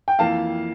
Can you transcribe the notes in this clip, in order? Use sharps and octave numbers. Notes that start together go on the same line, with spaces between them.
G5
F2 E3 A#3 F5 A5